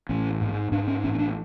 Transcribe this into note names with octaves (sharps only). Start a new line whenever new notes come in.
A1 C#4
G#2
G#2 D4
C#4
A1 C#4
C#4
D4